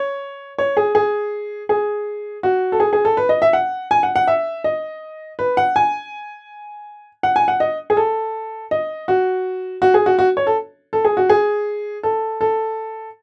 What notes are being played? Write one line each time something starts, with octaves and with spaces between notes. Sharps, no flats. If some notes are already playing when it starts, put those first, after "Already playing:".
Already playing: C#5
C#5
G#4
G#4
G#4
F#4
A4
G#4
G#4
A4
B4
D#5
E5
F#5
G#5
F#5
F#5
E5
D#5
B4
F#5
G#5
F#5
G#5
F#5
D#5
G#4
A4
D#5
F#4
F#4
G#4
F#4
F#4
C#5
A4
A4
G#4
F#4
G#4
A4
A4